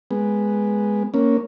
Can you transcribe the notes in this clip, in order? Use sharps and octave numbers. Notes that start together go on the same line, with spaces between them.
G#3 B3
A#3 C#4